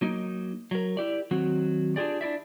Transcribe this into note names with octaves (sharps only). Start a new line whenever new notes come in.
F#3 A#3 D#4
F#3 A#4
E4 G4 D5
D#3 F#3 C4 F#4
D4 F4 G4 G#4 D5
D4 E4 D5 E5